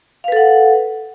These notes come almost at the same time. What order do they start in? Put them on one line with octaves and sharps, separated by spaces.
F5 B4 A4 F#5